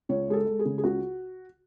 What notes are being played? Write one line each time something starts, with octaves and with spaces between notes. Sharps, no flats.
C#2 C#5
G#3 G#4
A4
G#3
G#4
C#3
G#4
C#2 F#4